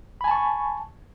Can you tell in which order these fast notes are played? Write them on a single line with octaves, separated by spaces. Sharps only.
B5 G#5 A5 C#6